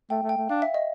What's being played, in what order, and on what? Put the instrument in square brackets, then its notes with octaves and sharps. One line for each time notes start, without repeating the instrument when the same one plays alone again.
[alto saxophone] A3 [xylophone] G5
[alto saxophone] A3
[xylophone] G5
[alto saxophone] A3
[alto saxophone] D4 [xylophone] F5
[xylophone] E5
D#5